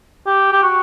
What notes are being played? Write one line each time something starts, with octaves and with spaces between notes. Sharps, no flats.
G4
G4
F#4